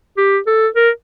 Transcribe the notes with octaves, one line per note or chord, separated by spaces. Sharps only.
G4
A4
A#4